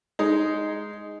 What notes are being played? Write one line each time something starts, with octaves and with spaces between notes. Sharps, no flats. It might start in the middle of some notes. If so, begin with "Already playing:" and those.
G#3 D#4